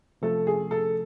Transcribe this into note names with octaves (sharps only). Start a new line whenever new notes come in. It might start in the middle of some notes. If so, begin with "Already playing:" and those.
C3 F3 A3 A4
G#4
A4